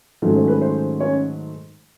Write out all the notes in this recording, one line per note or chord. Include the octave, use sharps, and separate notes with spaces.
G#2 D#3 F#3 A3 C#4
C5
B4
C5
C#4 C#5